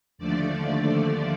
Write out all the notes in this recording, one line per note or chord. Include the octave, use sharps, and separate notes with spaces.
D#2 D3 F3 A3 D5